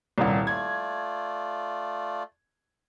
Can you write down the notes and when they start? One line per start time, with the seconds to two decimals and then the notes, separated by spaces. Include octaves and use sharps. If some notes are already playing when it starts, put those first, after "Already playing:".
0.18 D#1 C2
0.47 A3 F4 D5 G#6